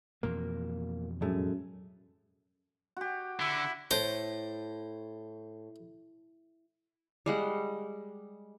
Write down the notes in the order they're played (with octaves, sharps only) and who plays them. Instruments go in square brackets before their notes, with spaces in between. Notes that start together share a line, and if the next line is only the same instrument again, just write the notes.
[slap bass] F2 B2 E3 [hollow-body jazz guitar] A#3
[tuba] F#2 [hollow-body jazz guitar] A2 G#3 A3
[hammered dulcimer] F#4 G4
[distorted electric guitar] D3 [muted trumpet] E4
[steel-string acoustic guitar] A2 [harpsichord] C5
[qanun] G3 G#3 F#5